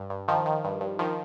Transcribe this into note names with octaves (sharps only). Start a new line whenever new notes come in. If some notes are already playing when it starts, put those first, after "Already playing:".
Already playing: G2
G2
D#3 F3
D#3
G2
G2
D#3 F3